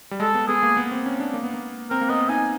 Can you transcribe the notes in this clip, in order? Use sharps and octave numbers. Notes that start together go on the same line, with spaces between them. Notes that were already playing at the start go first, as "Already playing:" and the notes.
G3
G#3 A4
B3
B3 G#4
A#3
B3
C4
C#4
D4
A#3
B3
A#3
C4 A#4
A#3
B3 D#5
D#4 G#5